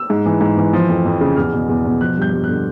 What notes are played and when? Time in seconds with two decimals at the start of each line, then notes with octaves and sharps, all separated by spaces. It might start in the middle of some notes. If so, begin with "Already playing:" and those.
Already playing: E6
0.10 G#2
0.26 E3
0.41 G#2
0.58 E3
0.73 F3
0.89 F2
1.05 F2
1.21 C#3
1.36 E2 F6
1.53 B2
1.69 E2
1.85 B2
2.00 F3 F#6
2.17 G2 G6
2.33 G2
2.44 F#6
2.49 D3